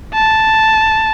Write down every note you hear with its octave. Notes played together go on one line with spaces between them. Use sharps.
A5